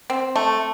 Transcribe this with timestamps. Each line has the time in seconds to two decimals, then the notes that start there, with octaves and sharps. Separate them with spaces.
0.10 C4
0.36 A3